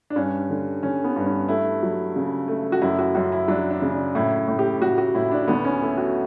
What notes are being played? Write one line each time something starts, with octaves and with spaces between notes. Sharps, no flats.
D4
G2 C#4
D3
D3 C#4
B3
G2
C#4
A3 E4
F#3
C#3
A3
F#4
F#2 E4
F#4
F#2 F#4
E4
F#3 D4
D4
C#3
D4
A2 E4
E4
A2
G4
A2 F#4
F#4
A2 E4
D4
D2 B3
C#4
A3 E4
F#4